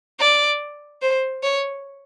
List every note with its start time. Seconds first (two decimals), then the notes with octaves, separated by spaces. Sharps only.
0.20 D5
1.02 C5
1.43 C#5